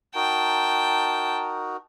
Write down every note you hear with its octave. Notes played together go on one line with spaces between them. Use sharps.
D#4 F#4 A#4 G5 A5